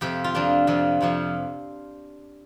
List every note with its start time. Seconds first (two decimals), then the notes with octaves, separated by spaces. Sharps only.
0.01 F2 C3 F3 G4
0.24 F4
0.34 F2 C3 F3 D4
0.67 F2 C3 F3
1.01 F2 C3 F3